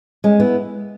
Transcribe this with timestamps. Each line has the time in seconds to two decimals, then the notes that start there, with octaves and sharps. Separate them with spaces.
0.24 G#3 C#4
0.40 B3 E4